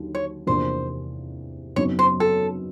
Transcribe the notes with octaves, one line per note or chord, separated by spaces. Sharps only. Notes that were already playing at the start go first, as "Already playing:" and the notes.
Already playing: D#2 D3 F#3
C#5
E2 C3 F3 A#3 D4 C5
F#2 C#3 F#3 B3 D#4 C#5
C5
A4